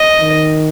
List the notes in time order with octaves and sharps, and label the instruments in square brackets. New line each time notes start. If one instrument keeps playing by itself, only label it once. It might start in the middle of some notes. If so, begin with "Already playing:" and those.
Already playing: [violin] D#5
[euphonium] D#3